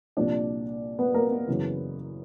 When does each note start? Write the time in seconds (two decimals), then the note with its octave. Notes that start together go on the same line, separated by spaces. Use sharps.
0.17 C2 A#2 F3 D4 D5
0.99 B3 B4
1.14 A#3 A#4
1.31 B3 B4
1.48 F#2 C#3 E3